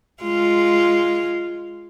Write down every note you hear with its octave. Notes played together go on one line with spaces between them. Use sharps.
G#3 F4